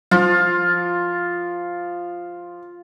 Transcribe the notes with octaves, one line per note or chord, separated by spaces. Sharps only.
F3 F4